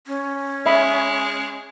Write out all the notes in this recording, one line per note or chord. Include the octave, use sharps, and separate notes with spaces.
C#4
G#3 D#5 E5 B5